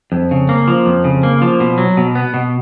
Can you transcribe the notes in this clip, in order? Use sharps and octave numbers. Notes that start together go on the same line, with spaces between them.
F2
C#3
A#3
F3
F2
C#3
A#3
F3
B2
F#3
B2
B3
B2